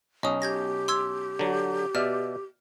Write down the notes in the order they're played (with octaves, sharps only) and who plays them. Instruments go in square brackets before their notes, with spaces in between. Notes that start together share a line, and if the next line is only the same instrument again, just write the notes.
[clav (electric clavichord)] B1 C#4 [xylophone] D#5 D#6
[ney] G4 [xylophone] G6 G#6 A#6
[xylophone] C6 E6 G#6
[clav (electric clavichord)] D3 F#3
[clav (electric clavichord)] B2 D5 E5 [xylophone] F6